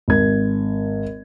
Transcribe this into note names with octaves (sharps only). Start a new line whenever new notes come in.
G#1 G#6